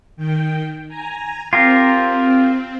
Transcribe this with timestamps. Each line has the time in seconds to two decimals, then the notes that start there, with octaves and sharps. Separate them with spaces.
0.17 D#3 G5
0.88 G#5 A#5
1.53 C4 F4 G4 A#4